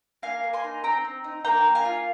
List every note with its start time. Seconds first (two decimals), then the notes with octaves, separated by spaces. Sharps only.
0.23 A#3 F5 G#5
0.43 A#3
0.53 G#5 C6
0.64 D#4
0.83 C4 G5 A#5
1.04 C4
1.24 D#4
1.44 A#3 G5 A#5
1.66 A#3
1.75 F5 G#5
1.85 F4